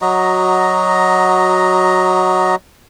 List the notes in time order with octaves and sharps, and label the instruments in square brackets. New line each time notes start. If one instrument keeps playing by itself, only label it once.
[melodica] F#3 F#4 D#5 A#5